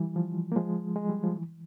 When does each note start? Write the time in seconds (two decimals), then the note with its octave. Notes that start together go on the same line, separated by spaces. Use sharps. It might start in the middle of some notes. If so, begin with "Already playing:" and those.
Already playing: E3 G3
0.16 F3
0.52 A#3
0.56 F3 G#3
0.96 G#3
1.09 G3
1.23 F3
1.36 E3